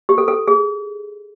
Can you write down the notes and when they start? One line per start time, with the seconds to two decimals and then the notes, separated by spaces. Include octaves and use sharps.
0.09 G4
0.18 A4
0.28 A4
0.48 G#4